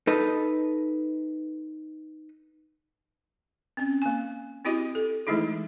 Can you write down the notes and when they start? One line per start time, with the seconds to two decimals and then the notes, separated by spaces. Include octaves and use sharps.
0.07 D#4 A4 B4 D#5
3.77 C4 C#4
4.02 A#3 G#5
4.65 C4 E4 F#4 G4 D#5
4.95 A4
5.27 E3 G#3 A3 D#4 E4 G#4